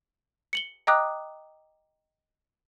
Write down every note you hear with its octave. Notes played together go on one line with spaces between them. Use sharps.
C#7 F#7 G7
D#5 G5 A#5 D6 D#6 F#6